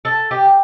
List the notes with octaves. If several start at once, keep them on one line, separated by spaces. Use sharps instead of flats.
A4
G4